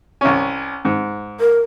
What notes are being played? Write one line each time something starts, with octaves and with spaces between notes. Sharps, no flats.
C2 C#4
G#2
A#4